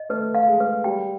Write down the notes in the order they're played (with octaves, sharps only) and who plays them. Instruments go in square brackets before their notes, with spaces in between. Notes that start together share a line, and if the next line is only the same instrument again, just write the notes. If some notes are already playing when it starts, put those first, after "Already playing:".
Already playing: [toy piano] D#5
[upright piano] A3 [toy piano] B4
[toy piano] F5
[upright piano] G#3
[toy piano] B4
[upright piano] G3 [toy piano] G5